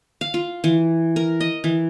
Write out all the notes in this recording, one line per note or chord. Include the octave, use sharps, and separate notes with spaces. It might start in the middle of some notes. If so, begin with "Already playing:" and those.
F5
F4
E3
A#4
D#5
E3